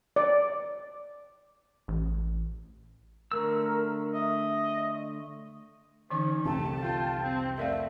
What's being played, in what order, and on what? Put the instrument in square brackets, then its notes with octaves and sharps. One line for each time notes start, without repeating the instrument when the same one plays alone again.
[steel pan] D5
[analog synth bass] A1
[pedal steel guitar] D3 A3 E6 [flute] A#4
[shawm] D#5 [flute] E5
[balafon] D3 E3 C#6 [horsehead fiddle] C#4 D#4
[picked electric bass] C2 F2 C3 [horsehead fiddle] A3 [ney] A5
[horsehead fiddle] F4 G5
C4
[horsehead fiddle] A3 C4 [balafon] A#4 D5 F5 [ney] E5